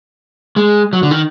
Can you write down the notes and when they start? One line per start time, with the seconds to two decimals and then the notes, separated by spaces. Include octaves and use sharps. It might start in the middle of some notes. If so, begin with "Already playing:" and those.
0.56 G#3
0.93 F#3
1.03 D3
1.11 D#3